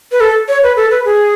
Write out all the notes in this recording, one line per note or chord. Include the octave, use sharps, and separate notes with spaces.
B4
A4
C#5
B4
A4
B4
G#4